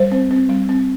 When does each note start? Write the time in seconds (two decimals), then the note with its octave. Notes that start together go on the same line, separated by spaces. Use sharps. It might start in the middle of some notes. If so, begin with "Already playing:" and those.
Already playing: G3 C5
0.12 C4
0.31 C4
0.49 G3
0.69 C4